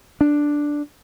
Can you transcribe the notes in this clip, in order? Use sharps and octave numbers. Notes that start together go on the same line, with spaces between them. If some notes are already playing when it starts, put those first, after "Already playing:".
D4